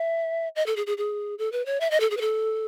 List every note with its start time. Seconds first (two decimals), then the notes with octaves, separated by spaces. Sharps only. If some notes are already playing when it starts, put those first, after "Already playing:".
Already playing: E5
0.56 D#5
0.66 A4
0.76 G#4
0.86 G#4
0.98 G#4
1.38 A4
1.52 B4
1.66 C#5
1.80 E5
1.91 D#5
2.00 A4
2.10 G#4
2.17 B4
2.21 A4